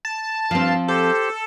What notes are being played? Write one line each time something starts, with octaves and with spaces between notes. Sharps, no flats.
A5
G2 F3 C4 F5
G4 A4 C5